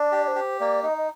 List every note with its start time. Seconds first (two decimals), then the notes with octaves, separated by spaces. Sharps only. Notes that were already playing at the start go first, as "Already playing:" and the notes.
Already playing: D4 D5
0.12 G4
0.24 D5
0.28 C5
0.36 G4
0.60 A#3 D5
0.83 D#4 D#5
0.97 D#5